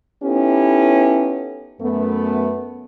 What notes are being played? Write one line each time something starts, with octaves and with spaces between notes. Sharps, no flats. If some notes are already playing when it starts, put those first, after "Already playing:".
B3 C#4 D#4 E4 G4 A4
F#2 A3 B3